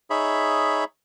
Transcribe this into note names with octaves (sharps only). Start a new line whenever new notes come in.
D#4 G#4 C#5 E5 B5